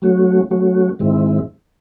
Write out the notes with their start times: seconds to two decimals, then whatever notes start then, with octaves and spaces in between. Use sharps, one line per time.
0.02 F#3 A3 C#4 F#4
0.51 F#3 A3 C#4 F#4
0.99 G#2 D#3 G#3 C4 E4